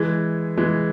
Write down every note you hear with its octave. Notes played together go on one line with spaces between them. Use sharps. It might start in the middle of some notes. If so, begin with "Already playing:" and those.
Already playing: E3 G#3
E3 G#3